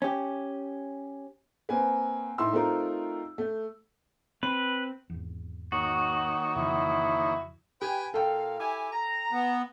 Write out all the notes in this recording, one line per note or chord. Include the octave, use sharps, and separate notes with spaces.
C#4 G4
A#3 C4 B4 G#5
A2 D#4 E4 C6 E6
A3 C4 D#4 F4 A#4
A3
C4 B4
G#1 E2
D#3 A#3 F#4 C#5
F2 C#3 E3 E4
G4 B4 G5 G#5
A#2 A4 F5 G5
E4 G4 G#5
A#5
B3